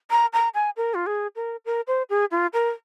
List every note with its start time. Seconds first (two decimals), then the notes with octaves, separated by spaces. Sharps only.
0.11 A#5
0.33 A#5
0.54 G#5
0.77 A#4
0.94 F4
1.06 G#4
1.36 A#4
1.66 A#4
1.87 C5
2.10 G#4
2.31 F4
2.53 A#4